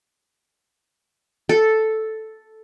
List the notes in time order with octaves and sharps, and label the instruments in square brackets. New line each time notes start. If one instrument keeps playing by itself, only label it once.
[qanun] A4